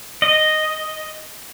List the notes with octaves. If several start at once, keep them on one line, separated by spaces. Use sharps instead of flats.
D#5